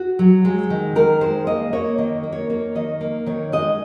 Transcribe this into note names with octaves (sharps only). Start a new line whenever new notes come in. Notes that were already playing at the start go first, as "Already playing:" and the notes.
Already playing: F#4
F#3
G#3
D#3
D#3 A#4
G#3 C5
A#3 D#5
A#3 C#5
D#3 D#5
A#3
C#5
A#3 C#5
D#3 D#5
A#3
D#3 C#5
G#3 D#5